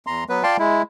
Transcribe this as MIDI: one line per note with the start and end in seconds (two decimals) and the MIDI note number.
0.07 0.24 40
0.07 0.24 82
0.07 0.24 84
0.29 0.43 54
0.29 0.43 59
0.29 0.43 71
0.43 0.57 65
0.43 0.57 74
0.43 0.57 77
0.43 0.57 79
0.43 0.57 81
0.43 0.57 84
0.59 0.82 56
0.59 0.82 64